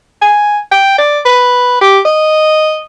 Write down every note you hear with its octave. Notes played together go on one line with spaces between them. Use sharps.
G#5
G5
D5
B4
G4
D#5